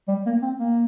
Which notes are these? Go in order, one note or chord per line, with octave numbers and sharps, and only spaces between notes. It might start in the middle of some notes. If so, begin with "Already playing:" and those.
G3
A#3
C4
A#3